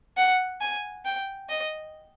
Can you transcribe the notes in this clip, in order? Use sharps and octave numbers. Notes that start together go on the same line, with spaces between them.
F#5
G#5
G5
D#5